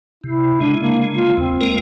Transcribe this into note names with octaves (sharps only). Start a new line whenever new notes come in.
C3 E4
C#3 G#3 D4
A#3
F4
E2 C4
G#3 A#3 A#4